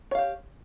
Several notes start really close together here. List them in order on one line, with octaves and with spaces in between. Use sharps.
C#5 F5 G4